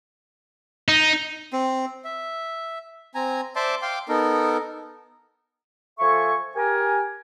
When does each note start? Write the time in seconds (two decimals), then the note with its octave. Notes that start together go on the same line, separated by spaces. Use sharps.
0.88 D#4
1.53 C4
2.04 E5
3.15 C4 G#5 A#5
3.56 C5 D5 E5 A5 C6 D6
3.82 F5 G5 C6 D6
4.09 B3 D#4 A4 A#4
5.99 F3 A4 E5 G#5 C#6
6.56 G4 A#4 G#5